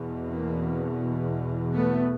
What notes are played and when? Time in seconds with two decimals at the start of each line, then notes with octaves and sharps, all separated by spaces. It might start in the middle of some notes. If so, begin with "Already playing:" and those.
Already playing: E2 B2
0.30 A#3 C4
1.74 A3 B3